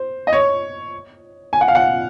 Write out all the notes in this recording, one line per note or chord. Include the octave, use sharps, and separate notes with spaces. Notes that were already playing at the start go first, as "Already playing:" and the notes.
Already playing: C5
D#5
C#5
G#5
F#5
F5
F#5